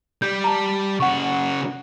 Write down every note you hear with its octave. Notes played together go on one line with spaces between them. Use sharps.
G3 G6
A5 A#5
C#3 F#4 F#5 C#6